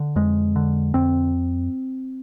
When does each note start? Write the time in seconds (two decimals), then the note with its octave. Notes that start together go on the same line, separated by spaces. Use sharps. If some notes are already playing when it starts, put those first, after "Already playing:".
Already playing: D3
0.16 F2 G#3
0.56 D3
0.94 F2 C4